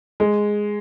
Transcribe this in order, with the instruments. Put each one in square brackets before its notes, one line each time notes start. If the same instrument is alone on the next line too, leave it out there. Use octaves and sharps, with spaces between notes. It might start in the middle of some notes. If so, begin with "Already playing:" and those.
[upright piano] G#3